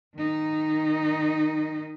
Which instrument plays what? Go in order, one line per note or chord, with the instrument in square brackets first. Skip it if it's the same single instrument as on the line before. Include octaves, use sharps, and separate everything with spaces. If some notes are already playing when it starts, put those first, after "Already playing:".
[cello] D#3 D#4